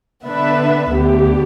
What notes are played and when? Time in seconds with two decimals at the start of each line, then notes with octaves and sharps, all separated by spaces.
0.24 D3 B3 D4 B4 E5
0.91 D2 D3 B3 G4